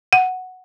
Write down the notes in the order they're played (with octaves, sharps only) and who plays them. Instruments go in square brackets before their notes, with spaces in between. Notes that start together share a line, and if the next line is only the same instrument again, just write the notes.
[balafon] F#5